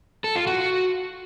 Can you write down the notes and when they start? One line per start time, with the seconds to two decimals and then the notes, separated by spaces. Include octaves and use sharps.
0.24 A4
0.35 F4
0.47 F#4